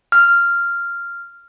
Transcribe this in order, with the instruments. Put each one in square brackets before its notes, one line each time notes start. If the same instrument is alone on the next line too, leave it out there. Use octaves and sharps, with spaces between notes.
[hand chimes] F6